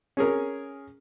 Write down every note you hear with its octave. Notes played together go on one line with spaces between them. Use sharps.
C#4 G#4 A#4